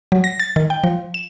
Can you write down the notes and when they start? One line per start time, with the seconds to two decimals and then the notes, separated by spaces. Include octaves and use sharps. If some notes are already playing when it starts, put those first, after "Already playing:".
0.12 F#3
0.24 A#6
0.40 A6
0.56 D#3
0.70 G5
0.84 F3
1.14 E7